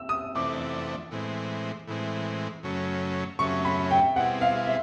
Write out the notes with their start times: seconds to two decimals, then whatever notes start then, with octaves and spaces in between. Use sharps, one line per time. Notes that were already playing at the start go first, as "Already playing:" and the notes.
Already playing: E6
0.09 D#6
0.35 F2 C3 E3 A3 D4 D6
1.11 A2 E3 G#3 C4
1.87 A2 E3 G#3 C4
2.63 F#2 C#3 F#3 A3 C#4
3.39 F#2 C#3 F#3 A3 C#4 C#6
3.65 B5
3.91 G5
4.16 B2 G3 C4 E4 G#4 F#5
4.41 F5
4.67 E5